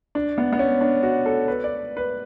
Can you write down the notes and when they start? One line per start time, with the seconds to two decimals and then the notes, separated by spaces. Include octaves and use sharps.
0.15 D4
0.38 B3
0.53 B3
0.59 C#4
0.81 D4
1.03 F#4
1.26 A4
1.48 B4
1.64 D5
1.97 B4